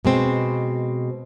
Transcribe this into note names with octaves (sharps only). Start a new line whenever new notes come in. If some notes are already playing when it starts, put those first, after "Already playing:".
B2 G#3 C4